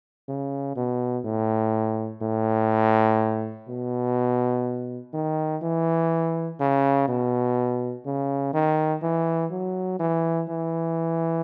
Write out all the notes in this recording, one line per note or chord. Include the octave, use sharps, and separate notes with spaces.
C#3
B2
A2
A2
B2
D#3
E3
C#3
B2
C#3
D#3
E3
F#3
E3
E3